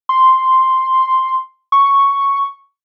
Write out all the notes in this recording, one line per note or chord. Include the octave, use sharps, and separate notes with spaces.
C6
C#6